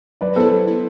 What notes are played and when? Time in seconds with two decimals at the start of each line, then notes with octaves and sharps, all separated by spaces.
0.21 F#3 B4 D5
0.36 B3 E4 A4 C5
0.51 F#3
0.67 B3 E4